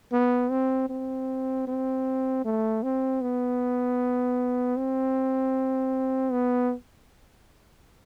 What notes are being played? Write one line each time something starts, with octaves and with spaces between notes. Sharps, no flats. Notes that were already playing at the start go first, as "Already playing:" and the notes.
B3
C4
C4
C4
A3
C4
B3
C4
B3